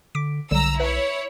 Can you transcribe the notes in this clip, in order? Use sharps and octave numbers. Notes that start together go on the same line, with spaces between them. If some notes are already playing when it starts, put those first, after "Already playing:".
D3 D6 B6 D7
B1 D3 F#3 G3 A#5 E6
E4 B4 C#5 E5